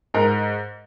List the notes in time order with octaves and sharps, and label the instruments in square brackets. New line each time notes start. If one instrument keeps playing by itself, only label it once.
[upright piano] G#2 A#4